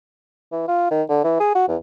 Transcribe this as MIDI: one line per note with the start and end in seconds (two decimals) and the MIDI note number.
0.52 0.65 52
0.68 0.90 65
0.91 1.03 51
1.09 1.20 50
1.24 1.38 52
1.40 1.50 68
1.55 1.68 66
1.68 1.77 40